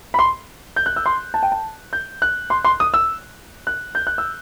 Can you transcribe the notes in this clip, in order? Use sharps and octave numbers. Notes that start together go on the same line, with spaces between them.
B5
C6
G6
F#6
E6
C6
A5
G5
A5
G6
F#6
C6
C6
D#6
E6
F#6
G6
F#6
E6